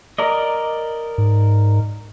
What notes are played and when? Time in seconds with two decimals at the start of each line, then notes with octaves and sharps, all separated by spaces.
0.18 A#4 D5 D#5
1.18 G#2